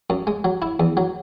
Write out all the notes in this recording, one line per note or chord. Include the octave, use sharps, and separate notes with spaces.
F#2
G#3
F#3
E4
E2
F#3